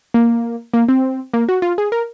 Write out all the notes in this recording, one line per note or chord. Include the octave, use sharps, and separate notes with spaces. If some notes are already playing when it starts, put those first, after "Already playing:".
A#3
A#3
C4
A#3
F#4
F4
G#4
A#4